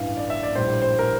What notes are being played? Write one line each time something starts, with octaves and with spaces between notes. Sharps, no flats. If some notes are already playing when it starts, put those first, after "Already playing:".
Already playing: A1 G2 E3 F5
D5
E5
D5
A#1 A2 G3 C5
C5
A#4